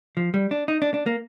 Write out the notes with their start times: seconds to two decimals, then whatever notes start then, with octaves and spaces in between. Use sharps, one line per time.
0.17 F3
0.34 G3
0.51 D4
0.68 D#4
0.82 D4
0.94 D4
1.06 A#3